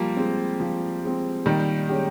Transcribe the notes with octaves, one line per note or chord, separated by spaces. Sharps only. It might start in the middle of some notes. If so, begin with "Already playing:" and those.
Already playing: F3 G3 A#3
G#3 C4
F3
G#3 C4
A#2 D#3 G3
G#3 C#4 G4